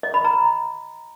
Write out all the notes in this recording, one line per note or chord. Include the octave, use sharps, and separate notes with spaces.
D#5
B5
A#5